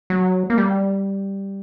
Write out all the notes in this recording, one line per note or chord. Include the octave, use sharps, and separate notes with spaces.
F#3
A#3
G3